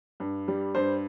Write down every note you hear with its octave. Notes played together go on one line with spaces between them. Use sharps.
G2
G3
G2 C5